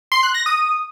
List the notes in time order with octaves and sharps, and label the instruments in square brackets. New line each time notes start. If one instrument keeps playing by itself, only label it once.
[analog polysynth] C6
F#6
A#6
D#6